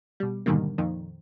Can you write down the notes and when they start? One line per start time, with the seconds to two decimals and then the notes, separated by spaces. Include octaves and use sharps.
0.20 B2 G3
0.46 G#2 B2 D3 D#3 G3 A#3
0.78 F2 A#2 D#3